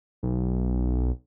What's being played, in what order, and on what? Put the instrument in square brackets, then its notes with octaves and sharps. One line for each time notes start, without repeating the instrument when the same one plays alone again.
[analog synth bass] B1